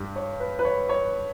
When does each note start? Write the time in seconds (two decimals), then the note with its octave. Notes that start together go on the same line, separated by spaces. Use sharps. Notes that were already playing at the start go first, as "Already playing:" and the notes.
Already playing: G2 G3
0.16 C#5
0.40 B4
0.59 B4
0.65 C#5
0.89 C#5